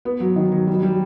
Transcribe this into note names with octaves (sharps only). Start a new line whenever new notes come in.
B3
F#3
D#3
F#3
G3
G3